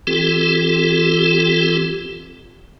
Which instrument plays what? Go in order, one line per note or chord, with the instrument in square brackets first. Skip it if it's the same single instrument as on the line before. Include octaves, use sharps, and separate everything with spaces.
[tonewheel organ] E3 C4 F4 G4 A4